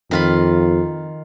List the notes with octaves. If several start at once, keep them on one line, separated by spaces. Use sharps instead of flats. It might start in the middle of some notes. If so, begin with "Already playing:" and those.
F2 D#3 F4 B5